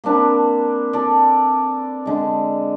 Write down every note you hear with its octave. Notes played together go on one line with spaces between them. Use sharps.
A#3 C4 D4 B4
A4 D5
D3 G#3